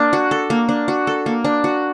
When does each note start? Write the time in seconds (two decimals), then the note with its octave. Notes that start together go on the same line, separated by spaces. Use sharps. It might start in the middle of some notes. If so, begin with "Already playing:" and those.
Already playing: A#3 D4
0.13 F#4
0.31 A4
0.50 A#3
0.69 D4
0.88 F#4
1.07 A4
1.26 A#3
1.44 D4
1.64 F#4